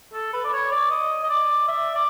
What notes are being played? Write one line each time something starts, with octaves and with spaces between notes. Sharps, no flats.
A4
B4
D5
C#5
D5
D#5
D#5
D5
E5
D5